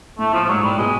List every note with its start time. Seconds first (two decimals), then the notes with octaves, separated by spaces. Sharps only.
0.19 A2 A3
0.33 A#2 F3
0.44 F3
0.48 G#2 F#3
0.63 A2 G3
0.78 B2 G#3